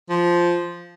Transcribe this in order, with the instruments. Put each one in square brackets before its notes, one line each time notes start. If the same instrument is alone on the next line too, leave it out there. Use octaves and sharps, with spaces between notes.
[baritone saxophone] F3